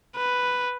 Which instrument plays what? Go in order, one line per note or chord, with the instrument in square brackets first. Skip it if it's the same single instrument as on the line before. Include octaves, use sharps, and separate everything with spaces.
[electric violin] B4